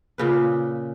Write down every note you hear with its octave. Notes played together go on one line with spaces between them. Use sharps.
A#2 C#3 B4